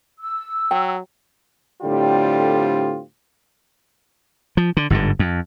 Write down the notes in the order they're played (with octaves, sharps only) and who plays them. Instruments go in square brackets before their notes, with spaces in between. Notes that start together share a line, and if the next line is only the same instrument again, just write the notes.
[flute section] E6
[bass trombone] F#3 [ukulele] G5
[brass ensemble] A2 D3 G3 C4 F4 G4
[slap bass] F3
D3
G1 G#2 B2 D3
F2